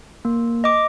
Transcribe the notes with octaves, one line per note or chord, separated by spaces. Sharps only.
A#3
D#5 D6